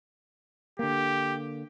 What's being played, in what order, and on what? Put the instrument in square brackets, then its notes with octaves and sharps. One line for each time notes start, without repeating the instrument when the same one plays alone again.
[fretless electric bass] D3 A#3 [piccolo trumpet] G4